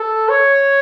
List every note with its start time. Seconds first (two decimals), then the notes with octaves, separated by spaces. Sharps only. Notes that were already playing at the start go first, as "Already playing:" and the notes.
Already playing: A4
0.29 C#5